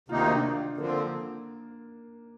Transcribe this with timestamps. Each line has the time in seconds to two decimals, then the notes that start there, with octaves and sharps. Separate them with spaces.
0.08 D2 C3 D#3 A#3 D#4 F4
0.26 D4
0.77 D3 F3 A#3 C4